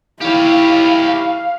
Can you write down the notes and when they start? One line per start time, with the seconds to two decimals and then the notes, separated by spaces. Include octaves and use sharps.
0.21 E4 G4 C#5 F5